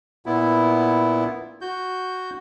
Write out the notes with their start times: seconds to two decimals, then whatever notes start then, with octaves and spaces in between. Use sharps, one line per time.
0.26 A#2 B3 E4
1.61 F#4 G6